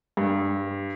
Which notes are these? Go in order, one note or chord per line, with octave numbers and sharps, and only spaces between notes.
G2